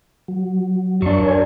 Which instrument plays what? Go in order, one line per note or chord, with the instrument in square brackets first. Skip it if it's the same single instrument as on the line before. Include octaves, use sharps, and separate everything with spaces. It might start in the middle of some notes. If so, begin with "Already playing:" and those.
[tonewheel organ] F#3
[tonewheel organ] F#2 C#6 [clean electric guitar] F#3 D4
[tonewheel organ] A#4 C#5 G#5